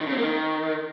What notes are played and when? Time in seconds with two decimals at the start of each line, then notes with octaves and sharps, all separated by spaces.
0.01 D#3
0.06 C#3
0.12 C4
0.18 A#3
0.23 D#3